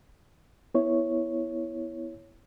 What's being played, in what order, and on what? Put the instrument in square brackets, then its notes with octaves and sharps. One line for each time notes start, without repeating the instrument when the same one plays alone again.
[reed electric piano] B3 E4 C#5